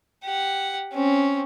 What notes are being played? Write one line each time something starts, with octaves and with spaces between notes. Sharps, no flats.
G4 F#5
C4 C#4